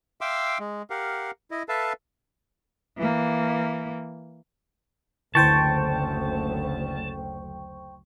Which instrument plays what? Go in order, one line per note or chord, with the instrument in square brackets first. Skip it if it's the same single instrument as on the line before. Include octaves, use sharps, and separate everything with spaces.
[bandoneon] E5 F5 G5 C6 D6 E6
G#3
G4 A#4 F5 F#5
E4 D#5
A4 B4 E5 F5 A5
[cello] E3 A#3
[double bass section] F#1 D2 [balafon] D3 E4 [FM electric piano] C5 G5 C#6 [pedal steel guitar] A5